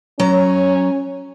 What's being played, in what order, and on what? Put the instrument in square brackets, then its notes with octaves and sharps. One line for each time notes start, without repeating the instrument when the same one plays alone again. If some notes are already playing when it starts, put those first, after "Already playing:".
[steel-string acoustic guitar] F#3 A#5 [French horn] C#4